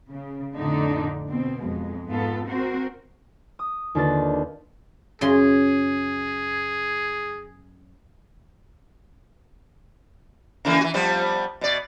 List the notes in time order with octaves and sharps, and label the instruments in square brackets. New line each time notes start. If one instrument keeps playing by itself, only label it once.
[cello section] C#3
F2 A2 D3 D4 D#4
B2 C4
F2 G#3
G#2 B3 F4 A4
C4 F#4 A#4 C5
[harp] D#6
D#2 D3 D4 F4 B4 A6
[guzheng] F#2 C#3 C6 [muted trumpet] G#4
[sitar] C#3 E3 A#3
E3 F#4
F3 G3 B3
B2 D5